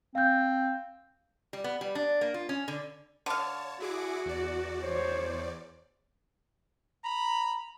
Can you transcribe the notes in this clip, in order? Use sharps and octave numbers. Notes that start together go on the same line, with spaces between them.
C4 F5 G6
G3
B3
G3
D4
A#3
F4
C#4
D3
D3 C#5 F5 A5
E4 F#4 G#4 D6
E2 D5
C5 C#5
A#5 B5